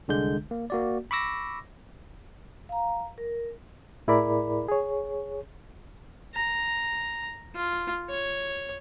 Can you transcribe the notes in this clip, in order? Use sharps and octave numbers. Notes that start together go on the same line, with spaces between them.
C2 D3 G#3 G6
A#3
A#3 F#4 D5
B5 C#6 D6 E6 A#6
F5 A#5
A#4
A2 E4 G#4 A#4 D5 B5
G#4 C#5
A#5
F4
C#5